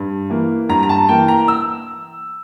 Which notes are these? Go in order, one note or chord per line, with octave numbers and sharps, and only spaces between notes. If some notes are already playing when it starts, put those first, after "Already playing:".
Already playing: G2
E3 A#3
G2 A#5
A#5
A5
E3 A#3 G5
A#5
E6